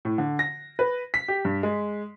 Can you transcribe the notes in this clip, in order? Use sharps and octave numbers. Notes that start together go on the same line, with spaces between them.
A2
D3
A#6
B4
B6
G4
G2
G#3